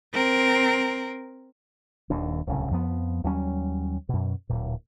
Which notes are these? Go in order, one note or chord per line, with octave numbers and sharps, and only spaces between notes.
C4 A#4
D#1 D#2 D4
D1 C2 C#3
F2 F3 B3
D#2 F#3 G3 C#4
F#2 B2
D1 A#2